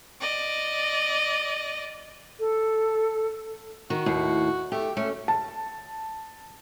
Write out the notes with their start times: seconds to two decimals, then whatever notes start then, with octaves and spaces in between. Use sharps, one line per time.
0.21 D5 D#5
2.39 A4
3.90 D#3 F#4
4.06 D#2 A2
4.72 A3 G4
4.97 A3 C#4
5.28 A5